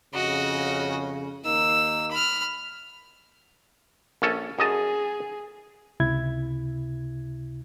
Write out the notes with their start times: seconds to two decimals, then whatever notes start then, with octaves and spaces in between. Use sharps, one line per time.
0.14 F2 C#3 F#4 D#5
1.45 D#2 A#3 D#4 E6
2.11 B5 F6
4.22 A#1 C#4 A4
4.59 F#2 G#4 D#5 A5
6.00 C#2 C3 E4 G#6